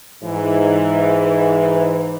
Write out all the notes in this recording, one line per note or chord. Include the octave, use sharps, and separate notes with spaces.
G#2 E3